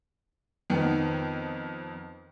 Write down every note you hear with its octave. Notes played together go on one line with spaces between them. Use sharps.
F2 D#3 B3